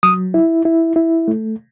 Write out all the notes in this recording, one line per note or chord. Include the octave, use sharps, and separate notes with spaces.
F#3 D#6
E4
E4
E4
A3